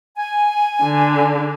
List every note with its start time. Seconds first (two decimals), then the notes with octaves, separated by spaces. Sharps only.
0.17 G#5
0.83 D3